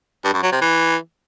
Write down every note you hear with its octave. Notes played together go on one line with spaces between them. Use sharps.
G2
F#2
F#3
C3
E3